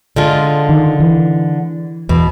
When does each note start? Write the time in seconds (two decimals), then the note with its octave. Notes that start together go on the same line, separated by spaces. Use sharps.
0.16 D3 G#3 F4
0.69 D#3
1.00 E3
2.09 E2 B2